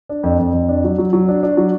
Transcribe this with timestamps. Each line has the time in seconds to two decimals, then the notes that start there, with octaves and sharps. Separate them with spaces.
0.09 D4
0.23 F2
0.39 F2
0.53 F2
0.69 D4
0.84 F#3
0.98 F#3
1.13 F#3
1.28 D4
1.43 D4
1.57 F#3